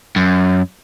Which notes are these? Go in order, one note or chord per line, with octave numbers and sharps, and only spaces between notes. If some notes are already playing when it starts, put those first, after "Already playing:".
F#2